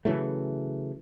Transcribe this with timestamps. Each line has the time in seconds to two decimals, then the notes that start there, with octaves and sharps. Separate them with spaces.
0.05 C#3 E3 F#3 A3